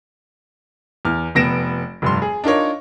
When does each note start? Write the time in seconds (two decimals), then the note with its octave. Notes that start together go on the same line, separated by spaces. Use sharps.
1.05 E2 F6
1.35 F1 B3 A#6 D7 E7
2.02 F1 G2 C6
2.22 G#4
2.44 D4 D#4 F4 A#4 C#5